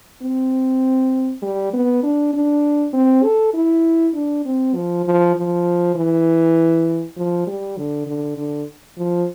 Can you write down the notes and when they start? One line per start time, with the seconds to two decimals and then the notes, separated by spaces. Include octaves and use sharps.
0.22 C4
1.42 G3
1.73 B3
2.03 D4
2.33 D4
2.93 C4
3.23 A4
3.54 E4
4.14 D4
4.45 C4
4.75 F3
5.05 F3
5.35 F3
5.95 E3
7.17 F3
7.47 G3
7.77 D3
8.06 D3
8.37 D3
8.97 F3